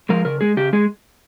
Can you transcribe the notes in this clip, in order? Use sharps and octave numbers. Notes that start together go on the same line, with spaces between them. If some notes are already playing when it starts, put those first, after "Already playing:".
F3 G#3 A#4
C#3 A#4
G#3 G#4
C#3 G4
G#3 G#4